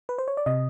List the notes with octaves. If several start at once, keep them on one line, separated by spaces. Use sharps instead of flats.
B4
C5
C#5
D5
C3 D#5